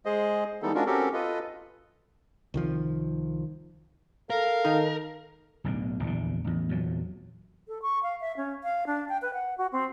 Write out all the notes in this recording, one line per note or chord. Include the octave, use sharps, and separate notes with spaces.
G#3 G#4 C5 D#5
E3 G3 G#3 B3 D#4 A4
G#3 C#4 D4 F4 F#4 A#4
C4 C#4 F#4 G4 A4 A#4
F4 A4 B4 D#5
C2 D#3 F3
A4 A#4 F5
D#3 D#4
D1 B1 D3
A#1 E2 D3
A1 E2
E2 A#2 F#3
A4
C#6
F5
E5
C#4
F5
D4
G5
B4
F#5
F#4
C4